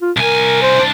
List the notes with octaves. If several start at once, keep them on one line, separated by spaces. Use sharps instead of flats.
F4
C2 A#4 G#5
C5
C2 D4